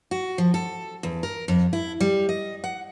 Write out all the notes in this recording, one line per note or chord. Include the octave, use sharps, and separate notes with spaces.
F#4
F3
A4
E2
A#4
F2
E4
G3
D#5
F#5